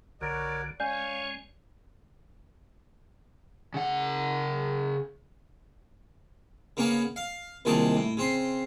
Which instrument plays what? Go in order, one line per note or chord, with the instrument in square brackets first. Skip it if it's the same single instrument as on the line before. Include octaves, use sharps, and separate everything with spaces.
[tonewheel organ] B1 D3 [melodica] F#4 A#4 C#5 [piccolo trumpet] D5
[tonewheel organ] G#3 C#4 [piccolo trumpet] C#5 [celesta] D5 G#5 G6 [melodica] F5
[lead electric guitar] C#3 F#5
[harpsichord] C#3 A#3 B3 C#5 G#5
F5
C2 A#2 D#3 G#3 D5 A5
A2
C#3 C4 C6